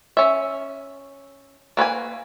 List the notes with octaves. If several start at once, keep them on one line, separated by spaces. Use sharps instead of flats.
C#4 E5
A#3 B4 C#5 G#5